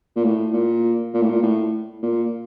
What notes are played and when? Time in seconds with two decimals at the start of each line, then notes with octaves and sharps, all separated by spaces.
0.16 A#2
0.24 A2
0.53 A#2
1.14 A#2
1.22 A2
1.29 A#2
1.43 A2
2.03 A#2